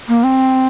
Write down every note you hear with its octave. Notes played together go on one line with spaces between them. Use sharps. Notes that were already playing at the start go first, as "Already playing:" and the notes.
A#3
C4